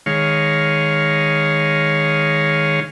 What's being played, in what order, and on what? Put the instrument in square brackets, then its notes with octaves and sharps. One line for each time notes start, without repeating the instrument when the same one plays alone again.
[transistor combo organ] D#3 G#3 C#5 F5